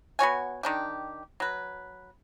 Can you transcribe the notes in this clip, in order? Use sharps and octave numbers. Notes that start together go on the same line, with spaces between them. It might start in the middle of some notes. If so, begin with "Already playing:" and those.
B3 F#4 C#5 G#5
D#3 D4 G4
F#3 B4